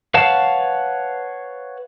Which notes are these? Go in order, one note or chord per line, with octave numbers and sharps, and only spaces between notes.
B4 C#5 F5 F#5 A5